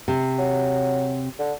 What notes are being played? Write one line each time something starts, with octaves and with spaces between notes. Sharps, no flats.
C3
F#3
D3